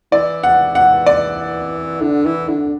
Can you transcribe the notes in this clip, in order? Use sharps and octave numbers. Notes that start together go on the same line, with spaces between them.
E3 D5
F#5
F#5
D5
D3
E3
D3